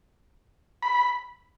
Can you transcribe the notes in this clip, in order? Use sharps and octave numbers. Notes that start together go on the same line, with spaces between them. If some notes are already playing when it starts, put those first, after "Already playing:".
B5